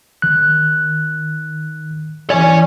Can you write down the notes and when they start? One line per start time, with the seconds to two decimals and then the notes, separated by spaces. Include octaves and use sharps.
0.22 D#3 F#6
2.30 E3 C#5 D5 G#5